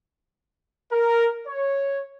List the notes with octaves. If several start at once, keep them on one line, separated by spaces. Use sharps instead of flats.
A#4
C#5